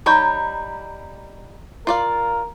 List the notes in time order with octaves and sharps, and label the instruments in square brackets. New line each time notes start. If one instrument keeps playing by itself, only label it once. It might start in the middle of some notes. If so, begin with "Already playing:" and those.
[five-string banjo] G3 D#4 C#5 [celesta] A#5 B5 G6
[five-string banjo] F4 D5 F5 [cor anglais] A#4